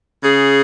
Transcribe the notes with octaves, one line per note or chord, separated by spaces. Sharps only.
C#3 G#4